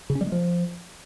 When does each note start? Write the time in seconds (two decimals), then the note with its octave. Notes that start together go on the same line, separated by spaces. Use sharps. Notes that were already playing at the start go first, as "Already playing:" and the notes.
0.10 C#3
0.15 C#4
0.21 G3
0.26 G#3
0.32 F3